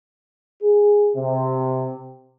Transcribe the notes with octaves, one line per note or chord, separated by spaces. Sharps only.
G#4
C3